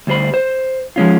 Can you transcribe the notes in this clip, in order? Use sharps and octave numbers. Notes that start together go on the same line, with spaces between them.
D2 G3 C5 B5
C5
F3 G#3 C#4 F4